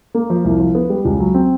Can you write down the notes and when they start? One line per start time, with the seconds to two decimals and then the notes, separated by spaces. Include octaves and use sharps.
0.15 A#3
0.30 F3
0.45 C2
0.60 F3
0.75 B3
0.90 G3
1.05 C#2
1.20 F#3
1.34 C4